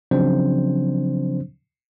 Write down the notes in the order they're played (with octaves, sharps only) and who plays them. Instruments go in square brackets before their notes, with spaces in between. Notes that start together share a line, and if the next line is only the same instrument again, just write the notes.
[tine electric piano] C#3 F3 F#3 C4 D4 C5